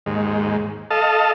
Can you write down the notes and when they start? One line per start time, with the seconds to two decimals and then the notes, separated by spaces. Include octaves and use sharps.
0.06 D#2 G#2
0.90 A4 D#5 F5 A5